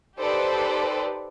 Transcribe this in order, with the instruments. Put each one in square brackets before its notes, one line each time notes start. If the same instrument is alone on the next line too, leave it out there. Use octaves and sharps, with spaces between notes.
[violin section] D#4 G4 A4 B4 C5 D5